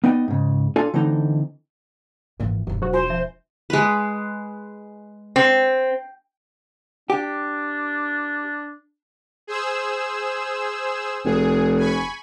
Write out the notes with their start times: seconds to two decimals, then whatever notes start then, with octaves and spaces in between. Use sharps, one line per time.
0.04 B3 D#4 D5 D#5 G5
0.28 G#2 C#3
0.76 D4 F4 A4 D5 F5 G#5
0.94 D3 E3 A3 C4 D#4
2.40 G#1 A#2 E3
2.67 E1 E2 G2 D4
2.82 F#3 F#4 C5
2.93 F4 C5 G#5 C6
3.10 F3 E5
3.70 G#3 B4
5.36 C4
7.10 D4 G4
9.47 G#4 C5 E6
11.25 F1 G#4
11.78 G#5 B5 C#6